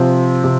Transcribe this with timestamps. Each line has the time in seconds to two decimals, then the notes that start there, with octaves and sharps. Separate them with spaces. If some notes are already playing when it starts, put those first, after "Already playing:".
Already playing: C3 F3 C4
0.44 C3